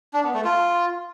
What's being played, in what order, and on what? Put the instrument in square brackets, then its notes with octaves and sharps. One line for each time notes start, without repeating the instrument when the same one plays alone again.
[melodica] D4
B3
A3
F4